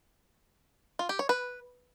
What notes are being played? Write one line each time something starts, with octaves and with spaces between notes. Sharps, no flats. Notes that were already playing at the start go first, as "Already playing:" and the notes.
F4
G4
C#5
B4